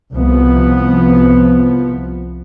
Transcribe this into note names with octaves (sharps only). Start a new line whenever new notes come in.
C2 F3 B3